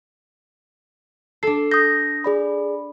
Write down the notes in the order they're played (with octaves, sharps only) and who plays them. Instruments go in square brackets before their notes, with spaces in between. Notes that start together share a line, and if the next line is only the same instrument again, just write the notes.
[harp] D4 A4 [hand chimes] C7
[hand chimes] D#6 A#6 [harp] G6
[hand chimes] G#4 D5 B5